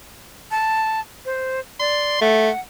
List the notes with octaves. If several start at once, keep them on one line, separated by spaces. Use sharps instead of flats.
A5
C5
D5 C6
A3 F#5